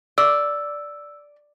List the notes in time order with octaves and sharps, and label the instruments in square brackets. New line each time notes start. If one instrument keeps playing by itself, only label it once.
[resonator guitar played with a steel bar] D5 [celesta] E6